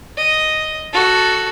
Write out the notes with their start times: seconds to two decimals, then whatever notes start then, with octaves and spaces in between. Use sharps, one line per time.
0.17 D#5
0.93 F#4 A4